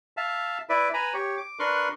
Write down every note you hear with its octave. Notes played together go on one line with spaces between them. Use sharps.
E5 F5 A5
E4 B4 D5 E5
B4 G#5 A#5 B5
G4 C#5
D6
D4 A#4 B4 C6 C#6 F#6